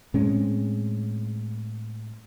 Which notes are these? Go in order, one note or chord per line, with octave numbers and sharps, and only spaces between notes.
A2 G#3 C4 C#4